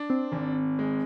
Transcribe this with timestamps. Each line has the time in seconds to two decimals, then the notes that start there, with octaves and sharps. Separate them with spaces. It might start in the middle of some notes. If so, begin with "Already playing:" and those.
Already playing: D4
0.10 C4
0.32 G#1
0.79 G#3